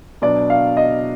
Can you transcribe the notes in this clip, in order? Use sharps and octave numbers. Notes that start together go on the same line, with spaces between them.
B2 F#3 D4 D5
F5
D#5